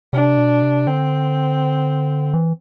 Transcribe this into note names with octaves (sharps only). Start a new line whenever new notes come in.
C3 D4
B2
C3
D3 C4
E3